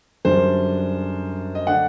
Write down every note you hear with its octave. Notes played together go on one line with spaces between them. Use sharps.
F#2 D3 G3 D4 C5
D#5
D3 A3 D4 F#5